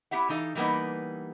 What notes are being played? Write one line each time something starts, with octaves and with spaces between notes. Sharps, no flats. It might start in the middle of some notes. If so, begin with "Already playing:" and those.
B3 E4 G4 E5 F#5
E3 D#4 A4 F5
E3 G3 A#3 B3 D#4